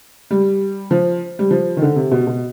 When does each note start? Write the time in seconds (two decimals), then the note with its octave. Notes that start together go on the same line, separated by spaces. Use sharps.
0.31 G3
0.91 F3
1.39 G3
1.51 F3
1.77 D#3
1.82 D3
1.96 C3
2.11 B2
2.27 B2